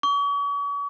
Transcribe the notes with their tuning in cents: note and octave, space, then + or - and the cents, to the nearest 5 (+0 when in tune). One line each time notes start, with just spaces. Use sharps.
C#6 +40